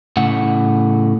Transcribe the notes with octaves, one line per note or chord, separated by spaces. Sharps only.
A2 C#3 F#5